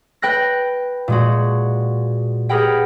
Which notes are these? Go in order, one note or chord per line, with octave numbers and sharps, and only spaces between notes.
B4 G5 F#6 A#6
A#2 G#3 F#4
G4 G#4 A#4 B4 F#5 G5